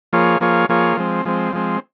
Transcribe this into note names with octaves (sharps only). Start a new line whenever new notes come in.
F3 A#3 F4 G#4 C#5
F3 A#3 F4 G#4 C#5
F3 A#3 F4 G#4 C#5
F3 G#3 C4
F3 G#3 C4
F3 G#3 C4